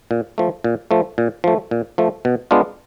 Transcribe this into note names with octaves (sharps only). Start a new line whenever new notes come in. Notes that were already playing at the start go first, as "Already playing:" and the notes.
A#2
F3 A3
A#2
F3 A3
A#2
F3 A3
A#2
F3 A3
B2
G#3 B3 D4 F4